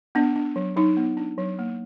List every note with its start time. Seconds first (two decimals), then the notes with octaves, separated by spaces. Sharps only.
0.15 B3 D4
0.36 D4
0.56 F#3
0.77 F#3 D#4
0.97 B3
1.17 D4
1.38 F#3
1.59 A#3